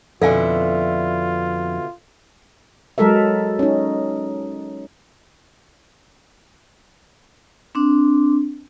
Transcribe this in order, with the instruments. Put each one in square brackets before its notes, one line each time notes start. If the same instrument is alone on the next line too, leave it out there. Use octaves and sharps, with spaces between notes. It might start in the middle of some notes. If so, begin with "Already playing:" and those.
[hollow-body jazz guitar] F2 [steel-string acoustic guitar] B2 D3 E4 [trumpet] F4 [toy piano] A4 F5 G#5
[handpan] F#3 G#3 A4 A#4 E5
C#4 D#4
[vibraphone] C4 D4